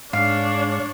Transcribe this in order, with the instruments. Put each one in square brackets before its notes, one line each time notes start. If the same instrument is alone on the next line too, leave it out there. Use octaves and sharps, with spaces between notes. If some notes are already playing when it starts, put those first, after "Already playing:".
[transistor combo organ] G#2 [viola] D4 C#5 [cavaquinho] F5